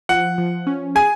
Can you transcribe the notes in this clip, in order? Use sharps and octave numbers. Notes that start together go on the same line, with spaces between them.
F3 F#5
F3
C#4
G#4 G#5